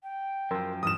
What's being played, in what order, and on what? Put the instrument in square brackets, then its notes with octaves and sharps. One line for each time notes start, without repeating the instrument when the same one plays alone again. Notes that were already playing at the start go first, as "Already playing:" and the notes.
[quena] G5
[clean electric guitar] F#2 F3 [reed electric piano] A#4 C6 E6
[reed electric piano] G2 E3 F6 [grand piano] D#6 E7